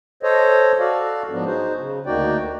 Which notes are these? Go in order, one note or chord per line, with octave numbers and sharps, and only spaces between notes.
A4 C5 C#5 D#5
F#4 A4 D5 F5
G#2 F3 F#3 B3 D4
D#4 F#4 G#4 C5
C#3
D2 A#3 D#4 F#4 D5 G5